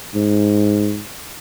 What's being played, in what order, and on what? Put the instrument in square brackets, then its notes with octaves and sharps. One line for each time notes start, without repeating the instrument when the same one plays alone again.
[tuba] G#2